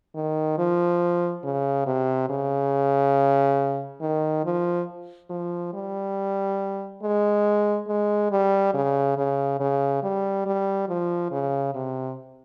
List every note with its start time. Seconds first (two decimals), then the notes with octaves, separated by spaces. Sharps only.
0.15 D#3
0.58 F3
1.44 C#3
1.86 C3
2.30 C#3
4.01 D#3
4.45 F3
5.30 F3
5.74 G3
7.03 G#3
7.88 G#3
8.31 G3
8.74 C#3
9.17 C#3
9.60 C#3
10.03 G3
10.46 G3
10.89 F3
11.32 C#3
11.75 C3